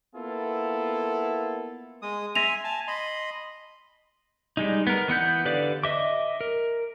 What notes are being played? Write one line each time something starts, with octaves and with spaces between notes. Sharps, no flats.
A#3 B3 E4 F4 A4
G#3 D#6
E5 G#5 C6 A#6 D#7 F7
G#5 A5
D#5 B5 C6
G3 G#3 D#4
B3 A#4
E3 B3 F#5 G6
D3 G4 B4 D5 F5
D#5 E5 D6
A#4